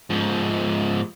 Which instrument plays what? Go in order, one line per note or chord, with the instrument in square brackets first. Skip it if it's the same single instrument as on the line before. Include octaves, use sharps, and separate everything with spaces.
[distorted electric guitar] G#2 F3